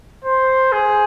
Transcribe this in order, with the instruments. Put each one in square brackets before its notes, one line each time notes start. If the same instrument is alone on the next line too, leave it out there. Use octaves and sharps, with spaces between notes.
[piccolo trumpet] C5
G#4